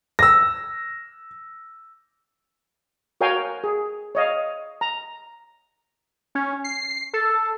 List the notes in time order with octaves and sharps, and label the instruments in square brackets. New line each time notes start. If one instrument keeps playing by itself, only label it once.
[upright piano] E6 A#6
[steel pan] F#4 A#4 C#5 F5 G5 G#5
G#4
C#5 D#5 F5
A#5
[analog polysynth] C#4
C7
A4